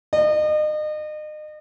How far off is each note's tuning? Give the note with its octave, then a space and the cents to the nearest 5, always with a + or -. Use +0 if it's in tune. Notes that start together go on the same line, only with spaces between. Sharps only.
D#5 -35